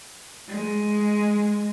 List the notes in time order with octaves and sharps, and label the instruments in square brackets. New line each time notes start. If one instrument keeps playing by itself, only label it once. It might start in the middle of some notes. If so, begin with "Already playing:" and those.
[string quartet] G#3